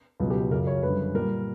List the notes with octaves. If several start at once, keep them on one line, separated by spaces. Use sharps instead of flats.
C#2 B2 F#3
G4
F#2 C#3 F#3 A#4
C#5
F#2 D3 G3 B4
A#2 G3 A#4